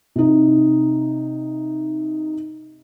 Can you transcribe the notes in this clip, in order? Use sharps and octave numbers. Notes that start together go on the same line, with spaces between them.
C3 D#4